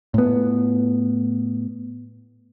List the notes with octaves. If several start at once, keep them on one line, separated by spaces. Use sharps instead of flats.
A2 B3